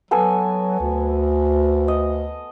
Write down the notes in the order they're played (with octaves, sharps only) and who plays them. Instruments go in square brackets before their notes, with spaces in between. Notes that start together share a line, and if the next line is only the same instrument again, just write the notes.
[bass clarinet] F#3 [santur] B3 A4 G#5
[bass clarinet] D2
[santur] D#5